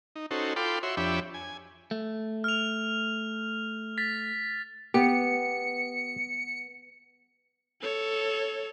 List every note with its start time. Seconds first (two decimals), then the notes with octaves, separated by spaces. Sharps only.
0.16 D#4
0.31 C#4 D#4 F#4 A4 C5
0.56 F4 A4 G5 B5 C6 D6
0.83 F#4 C#5 E5 C6
0.97 F2 D4 G4 C#5 E5 B5
1.34 G#5
1.91 A3
2.44 F6 F7
3.98 A6 B6
4.94 B3 G4 C#7
7.81 A4 C#5